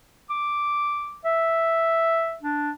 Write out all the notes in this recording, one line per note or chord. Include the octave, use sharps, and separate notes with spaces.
D6
E5
D4